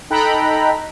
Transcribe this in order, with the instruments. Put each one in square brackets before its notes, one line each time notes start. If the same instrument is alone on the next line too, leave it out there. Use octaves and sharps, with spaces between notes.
[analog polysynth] D#4 A4 G5 A#5 B5 F#6